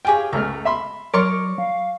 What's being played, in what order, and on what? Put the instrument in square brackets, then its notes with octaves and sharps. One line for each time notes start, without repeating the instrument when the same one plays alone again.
[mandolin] F4 G#4 C#5 [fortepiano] G4 G5
[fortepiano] C#2 A3 F6 [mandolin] A#5
[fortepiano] E5 B5 C6
[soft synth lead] F#3 [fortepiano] A#4 C#5 C6 [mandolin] D5 A#5 C#6
[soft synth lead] F5